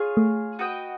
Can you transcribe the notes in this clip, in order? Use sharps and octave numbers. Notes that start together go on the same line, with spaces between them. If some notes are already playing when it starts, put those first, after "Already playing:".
Already playing: F4 G#4 C#5
A3
F#4 B4 D#5 G5